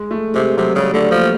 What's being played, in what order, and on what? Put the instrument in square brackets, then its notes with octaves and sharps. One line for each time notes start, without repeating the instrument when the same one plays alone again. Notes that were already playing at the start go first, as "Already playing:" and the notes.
Already playing: [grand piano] G#3
A3
[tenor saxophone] C3 [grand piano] G#3
[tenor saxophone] C3 [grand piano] F#3
[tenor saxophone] C#3 [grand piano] G3
[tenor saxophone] D3 [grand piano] A3
[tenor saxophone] F3 [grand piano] A#3